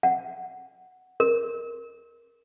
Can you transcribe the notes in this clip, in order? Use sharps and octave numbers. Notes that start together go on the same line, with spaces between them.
F#5
A#4